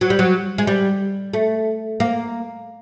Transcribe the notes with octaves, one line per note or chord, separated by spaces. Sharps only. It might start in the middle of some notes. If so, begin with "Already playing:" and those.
F#3
G3
F#3
G#3
G3
A3
A#3